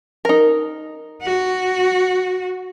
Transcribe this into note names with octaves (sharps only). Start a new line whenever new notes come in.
D#4 A#4
F#4